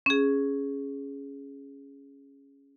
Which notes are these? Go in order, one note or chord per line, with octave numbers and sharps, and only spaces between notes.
C#4 G#4